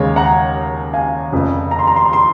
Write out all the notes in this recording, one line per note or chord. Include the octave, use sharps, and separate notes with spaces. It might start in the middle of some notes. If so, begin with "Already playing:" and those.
Already playing: D#2 C#3 G#3 C#5 F5
F#5 A#5
F5 G#5
F1 F2 C#3
A#5
C6
A#5
C6
A#5
C6